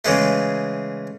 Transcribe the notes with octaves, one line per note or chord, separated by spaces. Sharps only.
C#3 E3 G#3 A3